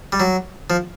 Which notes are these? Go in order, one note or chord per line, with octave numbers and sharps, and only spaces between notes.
G3
F#3
F3